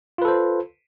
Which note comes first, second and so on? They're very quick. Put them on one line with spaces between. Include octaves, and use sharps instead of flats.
F4 B4 A4 C5